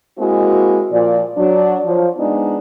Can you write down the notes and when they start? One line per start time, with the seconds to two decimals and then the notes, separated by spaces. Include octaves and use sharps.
0.18 G#3 A#3 C4 E4 F#4
0.92 A#2 F3 D5
1.38 F#3 D4
1.85 F3 F#3
2.18 G#3 B3 D4 D#4